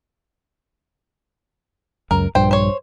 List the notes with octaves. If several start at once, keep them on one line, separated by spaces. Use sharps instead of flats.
C#2 F#2 A#4
A#1 G2 C5 G5
C5 C#5